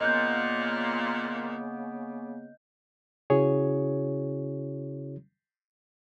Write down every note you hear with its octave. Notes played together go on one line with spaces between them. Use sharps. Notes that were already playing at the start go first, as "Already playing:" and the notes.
A#2 C#3 A#3 B3 D#5 F#6 G6
C#3 C#4 E4 F#4 G#4 C#5